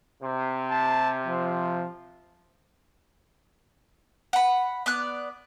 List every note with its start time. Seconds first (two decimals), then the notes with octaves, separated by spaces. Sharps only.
0.22 C3
0.71 A5
1.27 F3
4.33 F#5 B5
4.86 B3 D5 F#6